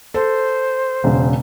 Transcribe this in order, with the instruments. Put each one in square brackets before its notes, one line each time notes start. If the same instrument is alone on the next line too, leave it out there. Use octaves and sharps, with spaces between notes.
[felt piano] A4 [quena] C5
[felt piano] E1 C#3